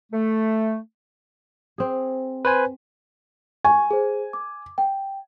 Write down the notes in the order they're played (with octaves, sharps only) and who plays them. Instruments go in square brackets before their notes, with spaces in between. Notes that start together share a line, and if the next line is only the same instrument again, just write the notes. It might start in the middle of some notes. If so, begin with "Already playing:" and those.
[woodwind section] A3
[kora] C4 G#4
[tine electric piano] B4 C5 G#5
[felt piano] G#5 [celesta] C#6
[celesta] G#4 C5
D6
G5